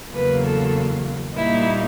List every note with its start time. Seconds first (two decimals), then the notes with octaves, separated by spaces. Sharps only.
0.13 E2 C#3 F#3 A#3 B4
0.45 A4
1.37 A#2 G3 A#3 D#4 E4